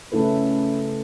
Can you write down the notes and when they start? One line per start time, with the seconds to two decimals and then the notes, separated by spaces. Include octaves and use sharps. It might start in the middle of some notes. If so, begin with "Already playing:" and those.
0.12 C#3 A3 C#4 E4 A4 B4